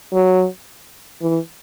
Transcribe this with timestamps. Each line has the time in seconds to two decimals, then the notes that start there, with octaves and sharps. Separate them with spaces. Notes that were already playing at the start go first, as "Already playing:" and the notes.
0.13 F#3
1.22 E3